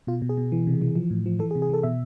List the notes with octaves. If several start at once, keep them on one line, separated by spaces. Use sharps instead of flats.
B2 F4
B2
G#4
B2
E3
C3
E3
F3
A2
F3
E3 A4
G#4
C3
G#4
E3 A4
B2 E5